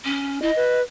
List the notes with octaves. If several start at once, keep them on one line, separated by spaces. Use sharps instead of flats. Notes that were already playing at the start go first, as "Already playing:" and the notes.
C#4
E4 D#5
B4